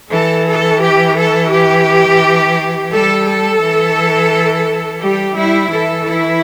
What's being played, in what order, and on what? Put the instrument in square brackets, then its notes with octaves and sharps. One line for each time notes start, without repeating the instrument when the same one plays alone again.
[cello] E3 [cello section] A4
[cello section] A4
G4
A4
G4
[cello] G3 [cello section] A4
[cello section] A4
[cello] E3
[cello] G3 [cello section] G4
[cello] G3 [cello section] E4
[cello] E3 [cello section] A4
[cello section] E4